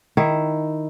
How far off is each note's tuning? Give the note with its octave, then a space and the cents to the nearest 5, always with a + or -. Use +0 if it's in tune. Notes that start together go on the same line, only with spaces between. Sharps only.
D#3 -5 E4 +0